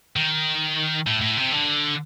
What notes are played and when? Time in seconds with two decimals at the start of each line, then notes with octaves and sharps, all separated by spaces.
0.16 D#3
1.07 A2
1.21 A2
1.37 C3
1.52 D3